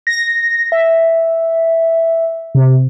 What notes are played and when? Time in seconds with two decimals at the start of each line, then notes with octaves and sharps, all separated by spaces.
0.07 A#6
0.72 E5
2.55 C3